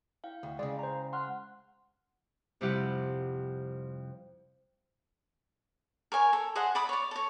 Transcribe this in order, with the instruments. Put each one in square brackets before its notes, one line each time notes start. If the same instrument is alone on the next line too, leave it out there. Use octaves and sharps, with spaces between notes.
[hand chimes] E4 F5 G5
[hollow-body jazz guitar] D2
[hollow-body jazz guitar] C#3 G#3 [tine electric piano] D5
[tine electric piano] C5 A#5
[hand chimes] F#5 F6 F#6 [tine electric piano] C6
[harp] F2 C3 G3 E4 G4 F#5
[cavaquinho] A#4 C#5 G#5
A4
G#4 C5 D#5 F#5
D5 B5 D#6
C#5 D5
A4 C#5